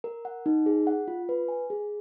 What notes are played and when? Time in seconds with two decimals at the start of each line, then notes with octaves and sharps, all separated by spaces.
0.04 A#4
0.25 F#5
0.46 D#4
0.66 G#4
0.87 F#5
1.08 F4
1.29 B4
1.48 G#5
1.70 G#4